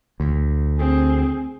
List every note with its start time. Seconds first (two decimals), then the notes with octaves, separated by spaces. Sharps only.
0.20 D2
0.79 C4 G#4